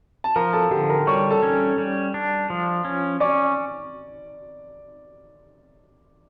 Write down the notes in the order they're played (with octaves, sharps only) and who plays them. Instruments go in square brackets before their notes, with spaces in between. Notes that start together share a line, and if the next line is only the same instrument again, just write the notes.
[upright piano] A5
[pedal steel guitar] F3 [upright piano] A#4 A#5
[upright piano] A4 A5
[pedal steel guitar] D3 [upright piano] G4 G5
[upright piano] A#4 A#5
[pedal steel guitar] G3 [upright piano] C#5 C#6
[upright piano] A4 A5
[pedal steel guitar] C#4
G3
D4
F3
C#4
[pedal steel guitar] C#4 [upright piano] D5 D6